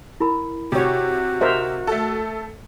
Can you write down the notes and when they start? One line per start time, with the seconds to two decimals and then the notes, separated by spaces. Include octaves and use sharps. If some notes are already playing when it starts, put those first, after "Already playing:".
0.20 E4 A#4 B5
0.72 C3 F#4 G4 C#5
1.41 A#4 C5 D#5 E5
1.87 A3 A4